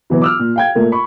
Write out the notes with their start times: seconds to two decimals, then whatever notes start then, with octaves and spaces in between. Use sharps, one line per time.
0.10 B2 E3 F#3 B3
0.22 D6 E6 F6
0.39 A#2
0.56 F5 G5 G#6
0.75 A#2 A3 A#4
0.92 B5 C#6